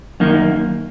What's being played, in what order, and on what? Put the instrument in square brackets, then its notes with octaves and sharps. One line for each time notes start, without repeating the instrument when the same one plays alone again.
[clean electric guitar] F#2 D#3 A#3